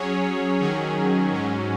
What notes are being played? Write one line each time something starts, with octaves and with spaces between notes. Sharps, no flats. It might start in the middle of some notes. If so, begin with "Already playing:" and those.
Already playing: F#3 C#4 G#4 C#5
D#3 F#3 C#4 G#4
G#2 F#3 C#4